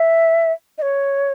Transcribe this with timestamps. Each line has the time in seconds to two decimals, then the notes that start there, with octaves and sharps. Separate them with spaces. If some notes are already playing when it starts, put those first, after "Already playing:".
Already playing: E5
0.78 D#5
0.82 C#5